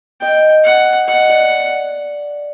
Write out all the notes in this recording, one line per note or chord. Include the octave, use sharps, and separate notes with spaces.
D#5 G5
F#5
D#5 F#5
D5